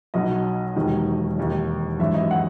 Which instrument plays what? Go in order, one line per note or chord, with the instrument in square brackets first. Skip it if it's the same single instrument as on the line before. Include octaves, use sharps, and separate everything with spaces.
[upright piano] B1 B2 F#3 D#5
E1 D#2 D#3 F#3
E1 D#2 D#3
G#1 F#2 E3 E5
D#5
F#5